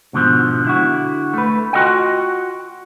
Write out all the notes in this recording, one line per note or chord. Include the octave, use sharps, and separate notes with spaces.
G#2 B2 D3 E3 F3
D3 E4 F#4
A3 B4
F4 F#4 A4 D#5 F#5 G5